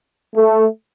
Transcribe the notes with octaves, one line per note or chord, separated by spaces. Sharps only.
A3